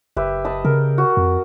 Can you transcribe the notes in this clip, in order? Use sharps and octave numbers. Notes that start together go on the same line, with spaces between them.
F#1 G4 B4 E5
B4 D#5 A5
C#3 A#4
F#4
F2